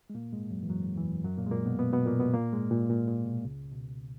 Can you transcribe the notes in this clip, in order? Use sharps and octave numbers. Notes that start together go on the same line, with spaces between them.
G#3
A#2 A#3
G#2 G#3
F#2 F#3
E3
F#2 F#3
E2 E3
F#2 F#3
A#2 A#3
G#3
A#2 A#3
B2 B3
B2 B3
B2 B3
A#2 A#3
B2 B3
A#2 A#3
G#2 G#3
A#2
A#2
A#2
B2
C#2 C#3
B2